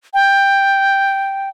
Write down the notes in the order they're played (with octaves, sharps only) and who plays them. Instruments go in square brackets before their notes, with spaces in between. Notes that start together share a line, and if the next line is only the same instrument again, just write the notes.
[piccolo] G5